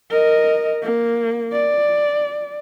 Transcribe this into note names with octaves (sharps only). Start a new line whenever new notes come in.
A#4 D#5
A#3
D5